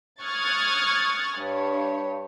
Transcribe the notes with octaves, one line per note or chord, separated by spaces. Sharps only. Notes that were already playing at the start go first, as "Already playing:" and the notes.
C#6 D#6 F6 F#6 G#6 A6
G2 C#5